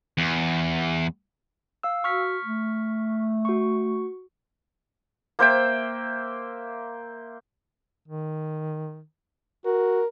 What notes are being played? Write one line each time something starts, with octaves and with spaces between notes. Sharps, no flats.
E2
F5 E6
F#4 C#6 F6 B6
A3
F#4 C#6
A#3 C5 E5 G5
D#3
F#4 A#4